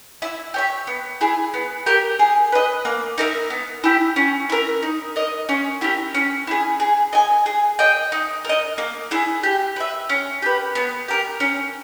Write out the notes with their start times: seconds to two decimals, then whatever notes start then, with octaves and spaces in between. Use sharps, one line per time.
0.22 E4
0.54 G4 C#5 E5
0.87 B3
1.21 E4 G#4
1.54 B3
1.86 G4 A#4
2.19 G#4
2.52 B4 D#5
2.85 A#3
3.18 D#4 A#4 E5
3.50 B3
3.84 E4 G4
4.16 C#4
4.50 E4 A#4
4.83 D#4
5.16 A#4 D#5
5.49 C#4
5.81 E4 G4 A#4
6.14 C#4
6.47 E4 G#4
6.80 G#4
7.13 D#5 G#5
7.46 G#4
7.79 D#5 G5
8.12 D#4
8.45 A#4 D#5
8.78 A#3
9.11 E4 G#4
9.43 G4
9.76 B4 E5
10.10 C#4
10.42 G4 B4
10.75 B3
11.08 G4 A#4
11.40 C#4